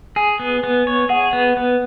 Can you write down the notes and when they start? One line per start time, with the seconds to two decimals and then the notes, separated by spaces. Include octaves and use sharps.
0.16 G#4 G#5
0.39 B3
0.64 B3
0.87 C#5
1.09 G#4 F#5
1.33 B3
1.57 B3